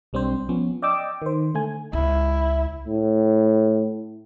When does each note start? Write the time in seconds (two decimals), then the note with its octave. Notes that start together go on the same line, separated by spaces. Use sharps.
0.13 B1 G3 C4 D4 C5
0.49 F3 B3 C#4
0.82 D5 D#5 G5 D6 E6
1.22 D#3 C5
1.54 D3 A3 G#5
1.93 C#2 E4
2.88 A2